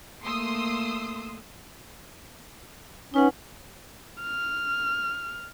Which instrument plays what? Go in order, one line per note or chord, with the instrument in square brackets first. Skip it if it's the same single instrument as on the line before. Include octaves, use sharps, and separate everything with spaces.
[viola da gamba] A3 A#3 [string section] C6 D#6 E6
[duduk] C#4 [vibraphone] D#4 B4 F#5
[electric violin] F6